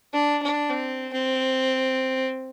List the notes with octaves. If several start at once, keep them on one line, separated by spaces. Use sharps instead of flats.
D4
D4
C4
C4